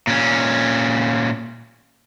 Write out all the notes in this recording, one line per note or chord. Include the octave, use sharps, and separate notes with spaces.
A#2 C#4